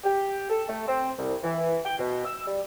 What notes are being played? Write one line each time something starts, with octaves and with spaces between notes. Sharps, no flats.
G4
A4
A3
C4
C2
E3
G5
B2
E6
G3